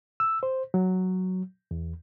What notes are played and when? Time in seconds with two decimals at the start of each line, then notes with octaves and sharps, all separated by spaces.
0.20 E6
0.43 C5
0.74 F#3
1.71 E2